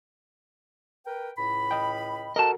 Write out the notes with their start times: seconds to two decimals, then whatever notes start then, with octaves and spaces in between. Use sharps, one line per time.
1.07 A#4 B4 G5
1.38 C#2 A2 B5
1.71 D#5 G5
2.36 F#4 A4 A#4 D#5 A5